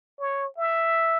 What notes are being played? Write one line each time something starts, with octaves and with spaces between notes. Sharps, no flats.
C#5
E5